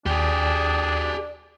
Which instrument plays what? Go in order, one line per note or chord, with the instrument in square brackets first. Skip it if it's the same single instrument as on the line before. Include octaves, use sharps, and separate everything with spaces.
[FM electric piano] D#2 [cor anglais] D4 [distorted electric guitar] G4 G#4 [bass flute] D5